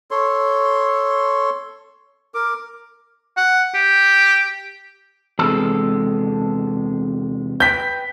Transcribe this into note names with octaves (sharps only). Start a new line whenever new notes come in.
A4 C#5 C6
A#4 D6
F#5
G4
E2 C3 G#3 A4
B4 G5 G6 B6